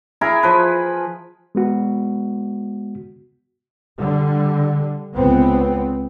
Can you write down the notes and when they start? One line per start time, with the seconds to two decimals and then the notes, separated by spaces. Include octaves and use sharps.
0.21 E4 G#4 A#4
0.43 F3 B4
1.55 G#3 B3 F#4
3.98 D3 G3
5.14 C#2 B3 C4